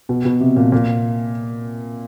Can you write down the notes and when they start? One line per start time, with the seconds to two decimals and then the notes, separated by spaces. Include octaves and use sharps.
0.09 B2
0.25 B2
0.41 C3
0.57 A#2
0.72 A#2